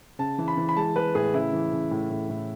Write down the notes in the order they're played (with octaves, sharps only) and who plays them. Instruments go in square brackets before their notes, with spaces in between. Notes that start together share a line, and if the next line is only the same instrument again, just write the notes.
[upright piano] C#3 A5
E3
B5
E3
B5
G#3 A5
G#3 B4
A2 G#4
C#3 E4
E3
C#3
A2
A2
A2